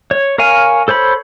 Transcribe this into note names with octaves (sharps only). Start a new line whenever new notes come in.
C#5
A#4 C#5 F5 G#5
A4 C5 C#5 B5